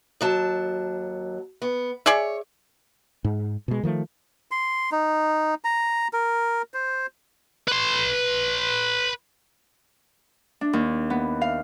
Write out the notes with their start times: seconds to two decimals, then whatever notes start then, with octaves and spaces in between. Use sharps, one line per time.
0.21 D#2 F#3 A5
1.62 B3
2.06 G#4 C#5 D5 E5
3.24 G#2
3.68 B2 G#3
3.83 D#3 F3 A3
4.51 C6
4.92 D#4
5.64 A#5
6.13 A#4
6.74 C5
7.68 B4 C6
10.61 D4
10.73 D#2
11.10 B3
11.41 F5